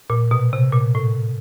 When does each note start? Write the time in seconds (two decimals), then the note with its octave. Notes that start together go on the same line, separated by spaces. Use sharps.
0.10 A#2
0.31 B2
0.53 C3
0.73 A#2
0.95 A2